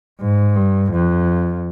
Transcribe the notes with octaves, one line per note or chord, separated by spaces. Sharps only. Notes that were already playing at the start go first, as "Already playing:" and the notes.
G#2
G2
F2